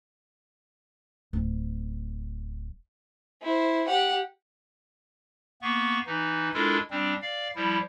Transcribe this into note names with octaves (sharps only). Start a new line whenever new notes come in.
D1
E4 C5
G4 F#5
A#3 B3 C#6
E3 D#4
G#3 D4 E4 F4 A4 A#4
G3 C4 D4
D5 F5
F3 G3 E4